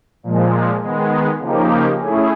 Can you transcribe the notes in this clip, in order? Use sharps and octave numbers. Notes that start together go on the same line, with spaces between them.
A#2 F3 G#3
D#3 G#3 B3
C#3 F3 A#3 D#4 G4
A3 C#4 E4 G#4